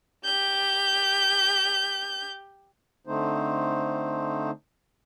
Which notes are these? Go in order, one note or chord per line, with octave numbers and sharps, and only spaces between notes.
G4 G6
D3 A3 C4 D#4 C5